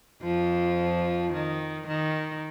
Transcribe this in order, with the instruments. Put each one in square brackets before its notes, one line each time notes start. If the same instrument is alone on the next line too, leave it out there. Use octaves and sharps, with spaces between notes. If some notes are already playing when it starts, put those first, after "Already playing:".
[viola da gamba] F2 F3
D#3
D#3